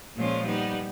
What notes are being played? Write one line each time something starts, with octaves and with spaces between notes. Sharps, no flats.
A#2 F3 G#3 C#4 F4
G3 B3 D#4